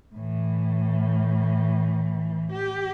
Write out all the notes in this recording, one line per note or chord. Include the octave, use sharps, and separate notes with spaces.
A2 E3
G4